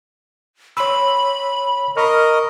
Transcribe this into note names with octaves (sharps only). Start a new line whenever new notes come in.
C#5 B5 C6 E6
A#4 D#5 B5 C#6 F6